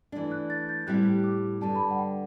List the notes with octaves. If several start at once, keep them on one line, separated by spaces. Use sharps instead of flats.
E3 A3 D4
F#6
A6
G6
A2 G3 C4 E4 G4 F#6
D6
G2 D3 G3 A5
B5
A5
F#5
G5